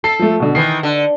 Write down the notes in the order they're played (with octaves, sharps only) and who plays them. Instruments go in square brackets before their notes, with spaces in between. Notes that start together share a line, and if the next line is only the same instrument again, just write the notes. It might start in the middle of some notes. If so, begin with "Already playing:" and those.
[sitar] A4 [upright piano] C7
[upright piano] F3 A3
B2 D3
[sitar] D#3 E3 [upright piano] C7
[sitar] D3